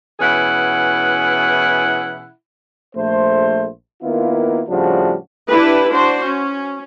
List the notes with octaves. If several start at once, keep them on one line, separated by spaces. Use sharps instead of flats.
B2 E3 C#4 E4 G#4 F#5
A#1 A3 C5
D#3 A#3 B3 E4 F4
A2 C#3 F3 G3 D4 F#4
D4 E4 G4 B4
D4 F#4 C5
C#4